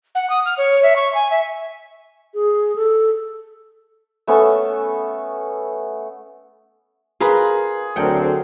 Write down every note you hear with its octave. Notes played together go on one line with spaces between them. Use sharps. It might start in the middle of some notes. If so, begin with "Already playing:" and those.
F#5
D#6
F6
C#5
E5
C#6
G#5
E5
G#4
A4
A3 B3 C#4 A4
F4 G#4 A#4 B4
D2 F#3 C4 D4 A#4 F#5 G5